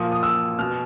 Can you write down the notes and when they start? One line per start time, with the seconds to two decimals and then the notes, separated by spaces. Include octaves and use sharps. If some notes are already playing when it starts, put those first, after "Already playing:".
Already playing: A#2 F3 D#6
0.12 D#6
0.23 E6
0.59 B2 F6